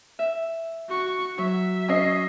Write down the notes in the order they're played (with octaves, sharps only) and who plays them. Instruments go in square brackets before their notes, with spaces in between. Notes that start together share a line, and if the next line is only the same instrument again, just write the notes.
[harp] E5
[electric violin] F#4 C#6
[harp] F#3 [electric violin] E5
[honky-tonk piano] C#4 D#5 C7